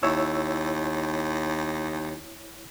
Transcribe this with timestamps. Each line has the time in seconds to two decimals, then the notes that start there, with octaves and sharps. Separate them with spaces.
0.03 D#2 E4 C#5 E6